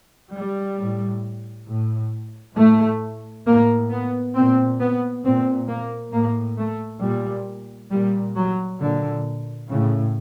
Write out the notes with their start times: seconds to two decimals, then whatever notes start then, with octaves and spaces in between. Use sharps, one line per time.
0.34 G3
0.78 A2
1.67 A2
2.56 A2 A3
3.46 A2 A#3
3.90 B3
4.34 A#2 C4
4.80 B3
5.23 A#2 C4
5.68 A#3
6.13 A2 A#3
6.58 A3
7.02 A#2 G3
7.91 A#2 G3
8.36 F#3
8.80 A#2 D3
9.70 A2 C#3